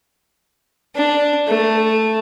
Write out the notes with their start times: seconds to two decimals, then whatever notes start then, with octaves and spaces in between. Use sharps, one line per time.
0.95 D4
1.48 A3